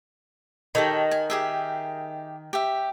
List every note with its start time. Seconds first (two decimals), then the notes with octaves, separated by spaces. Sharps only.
0.75 D#3 G4 A4 C#5
1.11 G#5
1.30 G4 G#4 E5
2.53 G4 E5